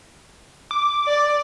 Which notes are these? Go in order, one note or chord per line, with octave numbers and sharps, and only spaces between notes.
D6
D5